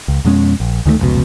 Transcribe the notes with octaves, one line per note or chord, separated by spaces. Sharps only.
C#2
F2 B2 G#3 C#4
A#1
D2 D#3 F3 A3
F1 C#2 B2